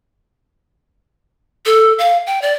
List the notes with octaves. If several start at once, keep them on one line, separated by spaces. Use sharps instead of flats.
A4
F5
G5
D5